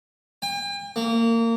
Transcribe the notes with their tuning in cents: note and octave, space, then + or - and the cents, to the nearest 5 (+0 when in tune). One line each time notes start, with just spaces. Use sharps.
G5 +45
A#3 -25